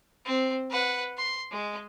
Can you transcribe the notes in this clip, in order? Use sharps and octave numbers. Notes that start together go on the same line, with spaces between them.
C4
B4 F#5
C6
G#3